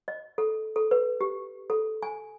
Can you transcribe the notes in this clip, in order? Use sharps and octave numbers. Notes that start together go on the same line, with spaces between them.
D#5
A4
A4
B4
G4
A4
G#5